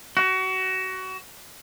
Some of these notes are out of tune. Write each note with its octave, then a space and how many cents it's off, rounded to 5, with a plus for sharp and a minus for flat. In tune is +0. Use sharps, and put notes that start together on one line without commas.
F#4 +25